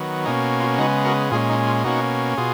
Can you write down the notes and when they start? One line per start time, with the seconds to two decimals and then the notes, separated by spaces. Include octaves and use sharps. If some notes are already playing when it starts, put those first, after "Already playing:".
Already playing: D#3 F#3 B3
0.26 B2 A#3 C#4 D#4
0.61 F4
0.78 C#3 G#3 B3 D#4 F#4
1.05 F#4 A#4
1.31 A#2 G#3 C#4 F4 G#4
1.50 D#4
1.67 F4
1.84 B2 A#3 C#4 D#4 F#4
2.37 B2 F4 G#4